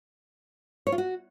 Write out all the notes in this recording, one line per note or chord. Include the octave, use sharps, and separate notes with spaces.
C#5
F4
F#4